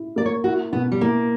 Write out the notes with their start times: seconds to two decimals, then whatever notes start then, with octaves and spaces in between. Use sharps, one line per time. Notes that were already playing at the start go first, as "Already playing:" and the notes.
Already playing: E4
0.16 A#3 D5
0.26 C#5
0.44 E4 F#4
0.72 B2 B3
0.92 G3
1.01 A#3 E4